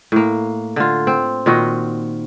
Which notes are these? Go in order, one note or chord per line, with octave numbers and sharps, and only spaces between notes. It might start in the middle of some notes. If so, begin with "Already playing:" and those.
A2 A#3
D3 F4
C4
A#2 D#3 F#4 D#5